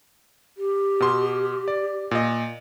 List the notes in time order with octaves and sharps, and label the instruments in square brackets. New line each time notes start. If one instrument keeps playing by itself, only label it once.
[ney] G4
[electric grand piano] B2 C6
D5
A#2 D#5